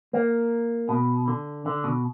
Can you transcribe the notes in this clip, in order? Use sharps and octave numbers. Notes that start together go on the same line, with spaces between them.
A#3
B2
D3
D3
B2